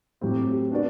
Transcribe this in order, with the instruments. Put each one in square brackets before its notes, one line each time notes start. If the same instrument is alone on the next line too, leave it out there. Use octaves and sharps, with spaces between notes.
[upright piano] A2 F#3 C4 [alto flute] G4
[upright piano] B3 D4 F#4 B4 D5